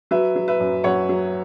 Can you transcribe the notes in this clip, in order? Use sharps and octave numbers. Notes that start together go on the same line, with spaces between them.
F#3 B4 E5
F#3
B4 E5
F#2
F#2 C#5 F#5
F#3